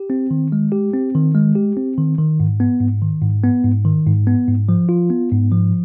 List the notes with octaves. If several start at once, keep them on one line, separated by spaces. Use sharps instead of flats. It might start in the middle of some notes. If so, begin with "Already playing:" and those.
Already playing: G4
C4
D#3
G#3
G4
C4
D#3
G#3
G4
C4
D#3
D#3
G#2
B3
G#2
D#3
G#2
B3
G#2
D#3
G#2
B3
G#2
F3
F4
B3
G#2
F3